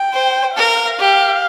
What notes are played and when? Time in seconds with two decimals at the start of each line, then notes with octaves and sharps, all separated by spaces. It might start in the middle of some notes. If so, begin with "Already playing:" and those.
Already playing: G5
0.13 C5
0.56 A#4 F5
0.99 G4